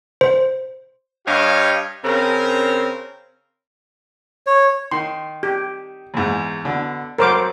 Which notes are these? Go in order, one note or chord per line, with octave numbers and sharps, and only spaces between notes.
C5
G2 G4 C#5 D#5 F5
C#3 C4 C#4 A#4
C#5
D#3 C6
G4
E2 G#2
B2 D3
G#1 F#3 A#4 C5 D6